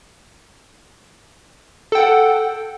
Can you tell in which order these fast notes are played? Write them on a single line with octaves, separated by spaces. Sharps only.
A4 G5 F#5